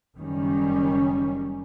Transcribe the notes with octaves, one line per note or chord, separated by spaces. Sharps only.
F#1 D#3 G3 C#4